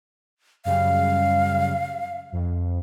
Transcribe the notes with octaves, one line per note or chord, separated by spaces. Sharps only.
F#2 C#3 G3 F5
F2